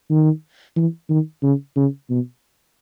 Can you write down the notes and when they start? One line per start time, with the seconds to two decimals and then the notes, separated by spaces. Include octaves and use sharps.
0.10 D#3
0.76 E3
1.10 D#3
1.43 C#3
1.76 C#3
2.10 B2